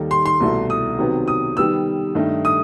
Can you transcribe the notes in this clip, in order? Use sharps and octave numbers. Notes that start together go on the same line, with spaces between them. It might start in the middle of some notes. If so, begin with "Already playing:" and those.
Already playing: D#2 D#3 G3 D#4 A4
C6
C6
C2 B2 A3 E4 A4
D#6
C3 D#3 F#3 B3
D#6
D#3 G3 B3 E6
G2 D#3 A3 D#4
D#6